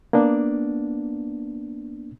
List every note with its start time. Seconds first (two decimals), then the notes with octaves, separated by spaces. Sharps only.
0.13 A#3 B3 D4